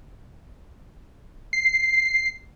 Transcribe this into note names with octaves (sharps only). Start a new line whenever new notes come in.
C7